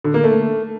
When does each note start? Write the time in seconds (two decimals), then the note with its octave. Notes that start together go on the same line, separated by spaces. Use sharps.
0.04 D3
0.14 A#3
0.24 A3